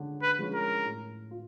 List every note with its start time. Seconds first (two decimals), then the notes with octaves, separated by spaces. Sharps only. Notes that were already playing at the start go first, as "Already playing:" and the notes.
Already playing: D3 G#3 C#4
0.22 B4
0.39 F3 G#3 C#4
0.54 A#4
0.85 A2
1.31 F4